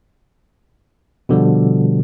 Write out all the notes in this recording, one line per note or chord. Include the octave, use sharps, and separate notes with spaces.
B2 D3 F3 G3